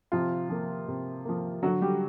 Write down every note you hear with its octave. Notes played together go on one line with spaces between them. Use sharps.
C3 F3 F4
F3 A#3
C3
F3 A#3
D3 F#3 F#4
G3 G4